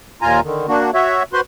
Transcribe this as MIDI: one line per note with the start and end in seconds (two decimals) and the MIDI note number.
0.22 0.40 39
0.22 0.40 46
0.22 0.40 65
0.22 0.40 80
0.22 0.40 82
0.44 0.67 50
0.44 0.67 51
0.68 0.91 58
0.68 0.91 62
0.68 0.91 66
0.94 1.23 66
0.94 1.23 73
0.94 1.23 76
1.33 1.41 66
1.33 1.41 71
1.33 1.41 72
1.33 1.41 84